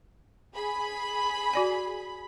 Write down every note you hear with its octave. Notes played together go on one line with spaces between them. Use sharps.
G#4 B5
F#4 D5 G#5